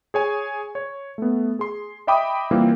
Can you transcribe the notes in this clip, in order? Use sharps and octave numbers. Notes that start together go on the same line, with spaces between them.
G#4 C#5 G#5
C#5
A3 B3
G#4 C6
D#5 E5 G5 B5 D6 D#6
E3 G3 A#3 C4 F4